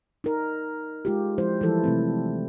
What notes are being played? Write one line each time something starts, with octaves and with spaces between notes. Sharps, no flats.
D#4 A#4
G#3 F4 G4
F3 G#3 E4 C5
E3 F3 G3 E4 A4
C3 A3 C4